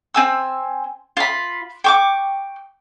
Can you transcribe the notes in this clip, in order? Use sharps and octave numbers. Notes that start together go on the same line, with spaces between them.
C4 G#5 E6
F4 B5
G5 C#6 D6